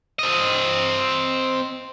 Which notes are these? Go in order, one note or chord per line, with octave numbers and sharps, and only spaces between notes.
C4 D#5